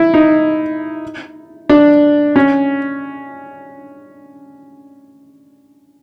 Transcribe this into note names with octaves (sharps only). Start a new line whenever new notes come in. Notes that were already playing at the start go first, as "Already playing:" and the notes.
Already playing: E4
D#4
D4
C#4